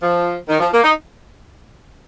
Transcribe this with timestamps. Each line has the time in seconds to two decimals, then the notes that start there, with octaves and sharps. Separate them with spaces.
0.02 F3
0.49 D#3
0.60 F3
0.72 A#3
0.84 D#4